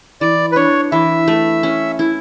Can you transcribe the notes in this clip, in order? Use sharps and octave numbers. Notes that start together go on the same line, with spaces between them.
E3 D5
B4
D4 C#5
E3 E5
A3
C#4
E4